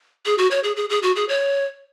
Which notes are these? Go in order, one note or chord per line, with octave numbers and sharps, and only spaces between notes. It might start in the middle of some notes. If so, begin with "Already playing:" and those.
G#4
F#4
C#5
G#4
G#4
G#4
F#4
G#4
C#5